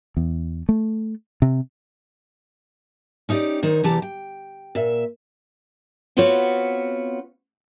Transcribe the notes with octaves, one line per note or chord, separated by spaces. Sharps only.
E2
A3
C3
C#4 D#4 E4 G4 D5
D#3 D#4 C5 C#5
E2 C3 E3 G4 A5 A#5
G5
A#2 E5
B3 C4 F4 F#4 B4 C#5